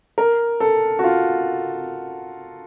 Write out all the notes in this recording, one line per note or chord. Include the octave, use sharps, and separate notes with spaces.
A#4
A4
F#4
F4